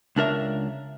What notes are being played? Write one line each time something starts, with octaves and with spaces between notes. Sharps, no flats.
C#2 D4 A#4 E5